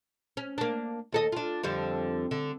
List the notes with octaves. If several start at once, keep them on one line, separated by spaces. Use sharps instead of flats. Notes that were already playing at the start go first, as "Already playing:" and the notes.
C#4
A#3 D4
D#2 A4 D#5
D4 F4
F2 D3 G3
D3